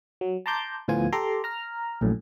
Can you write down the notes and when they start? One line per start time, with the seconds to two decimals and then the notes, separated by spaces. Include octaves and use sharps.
0.21 F#3
0.46 A5 A#5 C6 D6 G6
0.88 D2 A2 F3 B3 F4 G#5
1.13 G4 A4 A#5 C6 D6
1.44 A#5 F6
2.01 A#1 F#2 A2